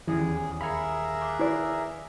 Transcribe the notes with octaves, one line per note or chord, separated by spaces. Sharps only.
D#1 E2 E3 G#4
G#4 A#4 E5 F5 G#5 B5 C#7
C6 D6 F#6
E4 B4 D5